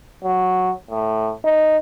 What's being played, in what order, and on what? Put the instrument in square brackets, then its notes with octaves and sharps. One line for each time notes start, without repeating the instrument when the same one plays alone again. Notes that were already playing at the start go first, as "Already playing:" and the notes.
[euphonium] F#3
A2
D#4